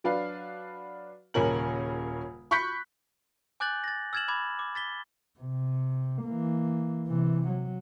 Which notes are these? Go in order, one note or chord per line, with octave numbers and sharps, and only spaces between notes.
F#3 D4 B4 F5
D#1 C#3 C#4 A#4 F#7
B5 C#6 F#6 G6 B6 C#7
G#5 D6 F#6 G6 A6 F#7
A6 A#6
E6 F6 G#6 A6 E7 F#7
B5 D6 G#6
D6
A6 B6 G7
C3
E3 A#3
C3 E3
F#3